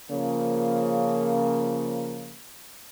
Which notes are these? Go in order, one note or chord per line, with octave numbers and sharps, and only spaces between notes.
C#3 F3 A#3